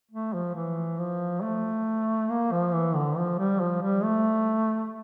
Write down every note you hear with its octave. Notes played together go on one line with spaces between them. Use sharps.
A3
F3
E3
F3
A3
A#3
F3
E3
D3
F3
G3
F3
G3
A3